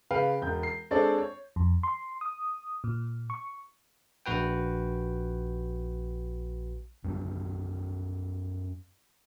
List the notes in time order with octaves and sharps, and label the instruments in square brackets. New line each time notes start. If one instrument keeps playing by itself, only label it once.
[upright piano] C#3 B4 F5 G5
E1 G6
C7
G#3 C4 D4 A4 C#5 D5
C#5
[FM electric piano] F2
C6
D#6
A#2
C#6
[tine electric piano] A#1 F#4 B4 G5
[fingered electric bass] F#2 G3 A3 B3